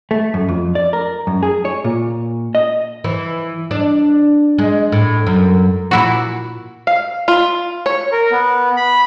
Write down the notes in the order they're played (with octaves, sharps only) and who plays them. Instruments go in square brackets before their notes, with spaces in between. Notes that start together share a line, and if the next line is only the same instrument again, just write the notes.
[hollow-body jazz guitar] A3
F#2
F2
D5
A#4
F#2
G#4
C#5
A#2
D#5
[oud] E3
D4
G#3
A2
F#2
[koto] A#2 E4 F#4
[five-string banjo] F5
F4
C#5
[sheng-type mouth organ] A#4
B3
B5